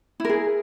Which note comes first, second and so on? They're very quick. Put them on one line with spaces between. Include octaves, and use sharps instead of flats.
E4 A#4 G#4